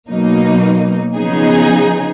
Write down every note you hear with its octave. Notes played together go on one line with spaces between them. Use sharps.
B2 F#3 A#3 D#4
C#3 F3 B3 D#4 G#4